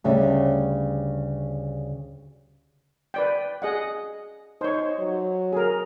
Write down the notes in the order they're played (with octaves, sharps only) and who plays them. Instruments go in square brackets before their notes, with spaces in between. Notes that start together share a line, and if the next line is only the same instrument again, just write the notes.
[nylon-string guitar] D2 C#3 G3 E5
[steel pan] B4 D5 G5
G#4 D#5 F#5
[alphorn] D#4 [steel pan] C5 C#5
[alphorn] F#3
[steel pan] G#4 A#4